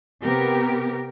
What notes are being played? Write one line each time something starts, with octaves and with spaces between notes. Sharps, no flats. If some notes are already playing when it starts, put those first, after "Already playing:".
C3 B3 G4 A#4